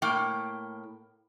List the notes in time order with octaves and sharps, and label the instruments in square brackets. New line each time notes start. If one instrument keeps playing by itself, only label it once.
[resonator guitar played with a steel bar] A2 A#3 G5